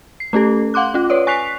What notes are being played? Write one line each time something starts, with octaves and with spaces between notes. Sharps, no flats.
C7
A3 C#4 G4 A4
F5 F#5 C6 D6 F#6
C#4 F4
B4 C#5 D5
G#5 C#6 F#6 B6 C7 F7